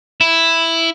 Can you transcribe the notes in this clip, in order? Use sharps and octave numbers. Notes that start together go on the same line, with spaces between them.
E4